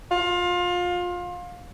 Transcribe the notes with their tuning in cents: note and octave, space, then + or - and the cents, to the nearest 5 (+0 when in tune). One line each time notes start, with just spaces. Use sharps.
F4 +25